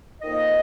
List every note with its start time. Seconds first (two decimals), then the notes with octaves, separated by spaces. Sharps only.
0.21 F2 D#3 A#3 D#4 D#5